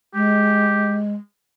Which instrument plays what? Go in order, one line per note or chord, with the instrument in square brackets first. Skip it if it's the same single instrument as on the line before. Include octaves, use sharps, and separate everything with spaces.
[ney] G#3 [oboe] G4